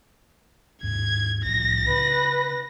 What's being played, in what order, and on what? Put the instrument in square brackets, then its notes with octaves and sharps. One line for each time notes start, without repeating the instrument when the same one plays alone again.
[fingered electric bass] D#2 G#2 [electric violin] G#6
[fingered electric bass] C2 A2 F3 [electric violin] A#6
[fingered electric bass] C#3 [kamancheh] B4